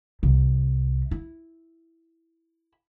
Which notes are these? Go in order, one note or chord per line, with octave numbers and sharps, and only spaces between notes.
C2
E4